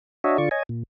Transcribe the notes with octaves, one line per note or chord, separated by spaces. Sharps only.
D4 F#4 C#5 D#5 E5
D3 F4 D5 C#6
C#5 D#5 G#5
A#2